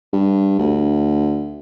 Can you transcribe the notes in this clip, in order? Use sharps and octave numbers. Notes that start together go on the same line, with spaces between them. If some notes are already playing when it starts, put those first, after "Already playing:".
G2
D2